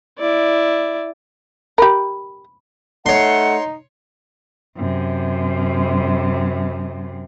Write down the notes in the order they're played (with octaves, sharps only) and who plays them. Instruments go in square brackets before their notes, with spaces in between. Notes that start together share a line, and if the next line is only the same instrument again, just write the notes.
[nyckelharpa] E4 D5
[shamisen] G4 A#4 [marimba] B5
[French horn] A3 [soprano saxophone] D#4 [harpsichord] C#5 C6 [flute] F#5
[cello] F#2 C3